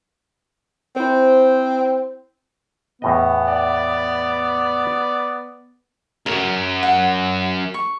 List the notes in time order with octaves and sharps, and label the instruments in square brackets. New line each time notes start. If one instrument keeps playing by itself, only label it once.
[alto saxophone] C4 [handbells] E4 C5
[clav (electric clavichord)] E2 A2 D#5 [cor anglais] B3
[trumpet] D5
[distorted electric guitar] C#2 F#2 [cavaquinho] A#4
[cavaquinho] F#5
C#6